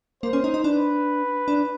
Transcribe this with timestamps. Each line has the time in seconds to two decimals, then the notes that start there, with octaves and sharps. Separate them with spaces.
0.23 A#3 C5
0.33 C#4
0.44 D#4
0.54 D#4
0.64 D4 B4
1.48 D4